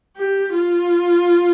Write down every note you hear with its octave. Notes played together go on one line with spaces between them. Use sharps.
G4
F4